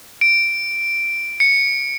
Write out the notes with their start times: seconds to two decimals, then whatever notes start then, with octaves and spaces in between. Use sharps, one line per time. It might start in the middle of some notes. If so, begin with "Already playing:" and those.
0.21 D7
1.40 C#7